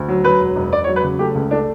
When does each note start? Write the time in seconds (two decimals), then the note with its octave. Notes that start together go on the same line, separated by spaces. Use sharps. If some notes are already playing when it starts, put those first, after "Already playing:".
Already playing: D2
0.08 F#3
0.24 F#3 B4
0.40 E1
0.56 E1
0.72 E1 D5
0.84 C#5
0.87 F#3
0.96 B4
1.03 C#3
1.19 A3 G4
1.35 C#2
1.51 A3 D4